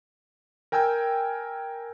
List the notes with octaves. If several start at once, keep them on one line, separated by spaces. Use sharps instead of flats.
A#4 G5 G#5 E6 G6